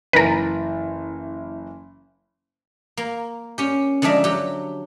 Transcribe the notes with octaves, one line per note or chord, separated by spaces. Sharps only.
F#1 E3 A#4 B4 A6
A#3
C#4 G4
D3 F3 G#3 D4 E5 A#5
F#3 G4